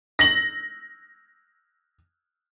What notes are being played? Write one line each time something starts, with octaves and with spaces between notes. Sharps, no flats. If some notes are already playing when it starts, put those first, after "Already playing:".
A#6 F#7